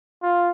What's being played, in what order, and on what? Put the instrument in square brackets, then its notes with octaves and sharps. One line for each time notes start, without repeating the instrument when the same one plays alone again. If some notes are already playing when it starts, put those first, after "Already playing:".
[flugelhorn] F4